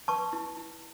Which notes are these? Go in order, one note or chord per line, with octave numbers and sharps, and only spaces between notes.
B4 A5 C#6
E4
E4